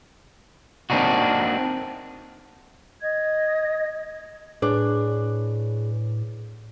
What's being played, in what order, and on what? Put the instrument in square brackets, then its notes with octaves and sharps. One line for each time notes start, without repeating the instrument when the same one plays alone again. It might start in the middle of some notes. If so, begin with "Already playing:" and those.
[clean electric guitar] A#3 C4 D4 D#4 F#4
[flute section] D#5 G#6
[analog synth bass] A2 [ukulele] D4 [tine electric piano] G#4 B4 C#5